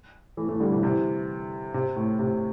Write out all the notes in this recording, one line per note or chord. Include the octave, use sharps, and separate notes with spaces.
E3 A3
E3 A3
D3 G3
C3 E3
C3 E3
C3
A2
C3